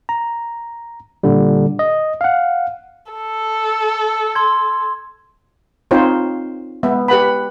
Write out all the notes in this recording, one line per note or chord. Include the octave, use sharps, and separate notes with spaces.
A#5
A#2 D3 G3
D#5
F5 F#5
A4
C6 G#6
C4 D#4 F4 C5 C#5
G#3 B3 E5
G4 B4 F#5 B5